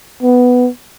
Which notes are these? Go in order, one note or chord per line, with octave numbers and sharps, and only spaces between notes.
B3